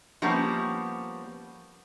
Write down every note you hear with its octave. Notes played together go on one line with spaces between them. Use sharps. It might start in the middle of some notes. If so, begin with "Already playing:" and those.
F3 G3 A#3 B3 C#4